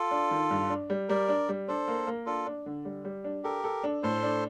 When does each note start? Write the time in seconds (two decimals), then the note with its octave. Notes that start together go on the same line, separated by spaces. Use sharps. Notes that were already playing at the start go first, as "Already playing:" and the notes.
Already playing: F4 A4
0.11 D4
0.31 D#3
0.51 G2
0.70 D4
0.90 G3
1.09 G3 A#4 D5
1.28 D4
1.49 G3
1.68 D4 A4 C5
1.88 A#3
2.07 A#3
2.26 D4 F4 A4
2.46 D4
2.66 D3
2.85 G3
3.05 G3
3.24 D4
3.44 G4 A4 A#4
3.64 A4
3.84 D4
4.03 A2 A4 C5
4.23 D4